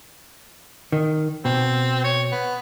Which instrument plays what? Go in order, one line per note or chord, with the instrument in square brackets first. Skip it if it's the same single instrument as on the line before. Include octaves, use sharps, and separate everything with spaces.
[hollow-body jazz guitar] D#3
[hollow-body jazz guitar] B2 [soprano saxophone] C4
[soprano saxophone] C#5
B3